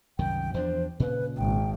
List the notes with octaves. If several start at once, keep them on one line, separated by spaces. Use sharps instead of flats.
C2 F#2 D#3 G5
E2 F3 D4 C5
A#2 C#3 B4
G#1 G5